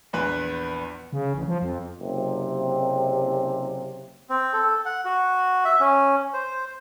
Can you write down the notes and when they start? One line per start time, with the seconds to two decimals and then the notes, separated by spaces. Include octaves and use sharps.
0.13 A#1 E2 B4 F#6
1.13 C#3
1.34 A1
1.48 F3
1.62 F2
2.01 F#1 C3
4.29 C4
4.53 A4
4.85 F#5
5.05 F#4
5.65 E5
5.80 C#4
6.34 C5